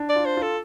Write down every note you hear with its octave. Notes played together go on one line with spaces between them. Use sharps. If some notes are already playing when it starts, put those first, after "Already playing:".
Already playing: D4
D5
F4
C5
F4 A4